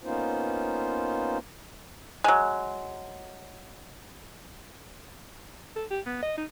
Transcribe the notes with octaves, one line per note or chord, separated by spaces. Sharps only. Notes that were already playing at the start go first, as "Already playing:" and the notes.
A#3 B3 C#4 D#4 F4 C5
F#3 G#3
A4
G4
B3
D#5
D#4